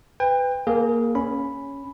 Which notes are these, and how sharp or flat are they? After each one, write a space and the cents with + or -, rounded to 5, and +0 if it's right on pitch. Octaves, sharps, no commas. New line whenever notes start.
B4 +25 G5 +35
A#3 +0 G#4 +25 B4 -40
C#4 +5 B5 +0